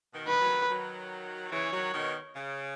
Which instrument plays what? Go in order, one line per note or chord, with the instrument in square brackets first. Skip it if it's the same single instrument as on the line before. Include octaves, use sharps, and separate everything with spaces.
[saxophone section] B2 D#3
[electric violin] B4
[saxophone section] D#3 F#3
D#3 F#3
[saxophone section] C#3 E3 [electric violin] C#5
[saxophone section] D#3 F#3
B2 D#3
C#3